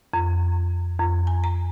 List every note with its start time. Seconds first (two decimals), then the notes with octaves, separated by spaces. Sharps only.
0.13 F2
1.00 F2
1.27 G#5
1.44 A#5